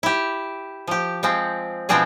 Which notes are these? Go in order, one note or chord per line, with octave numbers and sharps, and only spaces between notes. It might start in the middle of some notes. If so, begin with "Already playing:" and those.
E4 G4
F3 G4
F3 G#3 C4
B2 F3 G#3 C4 D4 G#4